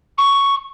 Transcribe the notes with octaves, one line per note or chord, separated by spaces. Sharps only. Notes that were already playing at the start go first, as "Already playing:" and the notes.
C#6